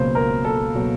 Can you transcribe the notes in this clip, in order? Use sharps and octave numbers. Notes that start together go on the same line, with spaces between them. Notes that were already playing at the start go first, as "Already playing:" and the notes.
Already playing: C#2 B2 F#3 A#3 C5
A#4
A4
B2 F#3 A#3